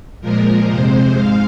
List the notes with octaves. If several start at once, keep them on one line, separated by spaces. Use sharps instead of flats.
A#2 F3 G#3 A#4
F2 C3 G#3 C5
G#2 G#3 F5